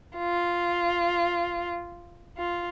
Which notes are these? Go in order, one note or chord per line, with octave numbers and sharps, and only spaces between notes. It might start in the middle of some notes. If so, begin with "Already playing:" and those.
F4
F4